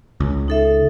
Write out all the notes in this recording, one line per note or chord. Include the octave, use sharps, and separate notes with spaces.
C#2
D#4 A4 E5